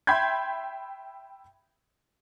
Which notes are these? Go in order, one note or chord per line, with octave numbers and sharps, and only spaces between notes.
E5 G5 B5 C6 G6 G#6